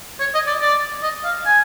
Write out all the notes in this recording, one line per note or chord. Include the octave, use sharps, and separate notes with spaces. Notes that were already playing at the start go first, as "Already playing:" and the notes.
C#5
D#5
D5
D5
D#5
F5
G#5